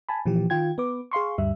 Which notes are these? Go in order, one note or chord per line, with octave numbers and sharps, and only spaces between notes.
G#5 A5 B5
A#2 E3 F3 G4
D#3 F4 G5 G#6
B3 B4 D6
G#4 F5 C6 C#6
D2 G2 G3 E5